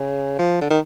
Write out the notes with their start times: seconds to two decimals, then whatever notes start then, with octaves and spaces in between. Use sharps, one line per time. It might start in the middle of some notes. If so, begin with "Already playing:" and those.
Already playing: C#3
0.39 F3
0.61 D3
0.70 D#3